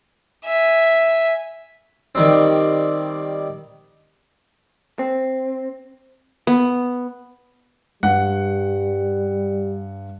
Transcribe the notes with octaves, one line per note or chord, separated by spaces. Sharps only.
E5 G#5
D#3 G3 C4
C4
B3
G2 G3 F#5